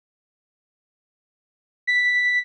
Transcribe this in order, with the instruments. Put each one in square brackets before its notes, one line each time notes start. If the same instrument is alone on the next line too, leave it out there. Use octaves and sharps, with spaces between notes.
[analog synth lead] B6